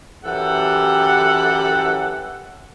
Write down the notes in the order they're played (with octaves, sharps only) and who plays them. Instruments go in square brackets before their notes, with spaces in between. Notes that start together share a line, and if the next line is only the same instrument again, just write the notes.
[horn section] F#2 E3 G4 A4 F#5